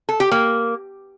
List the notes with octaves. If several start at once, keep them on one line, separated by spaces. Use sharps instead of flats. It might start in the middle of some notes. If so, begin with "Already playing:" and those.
A4
G4
A#3